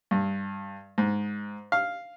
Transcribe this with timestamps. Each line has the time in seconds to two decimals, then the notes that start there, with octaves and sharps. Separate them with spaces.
0.11 G2
0.98 G#2
1.72 F5